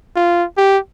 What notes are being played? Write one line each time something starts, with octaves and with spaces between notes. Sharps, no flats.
F4
G4